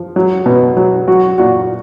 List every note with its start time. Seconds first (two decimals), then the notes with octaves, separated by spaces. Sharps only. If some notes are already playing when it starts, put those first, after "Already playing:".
Already playing: F3
0.16 F#3
0.46 B2
0.77 F#3
1.08 F#3 F#4
1.38 A#2 F#4